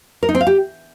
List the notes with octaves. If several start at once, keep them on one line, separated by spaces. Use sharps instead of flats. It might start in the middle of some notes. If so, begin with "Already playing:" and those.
A#4
D#4
C4
F5
G4